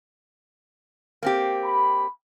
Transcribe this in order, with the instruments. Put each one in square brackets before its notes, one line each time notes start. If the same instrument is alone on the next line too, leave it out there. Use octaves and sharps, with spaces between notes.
[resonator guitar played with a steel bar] A#3 C4 G4
[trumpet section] B5